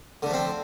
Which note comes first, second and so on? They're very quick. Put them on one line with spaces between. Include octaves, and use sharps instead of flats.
D3 A3 F3 C4